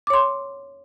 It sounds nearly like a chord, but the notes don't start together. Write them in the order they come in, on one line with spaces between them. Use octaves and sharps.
D6 C#5 C6